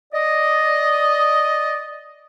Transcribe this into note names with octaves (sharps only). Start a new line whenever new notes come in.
D5 D#5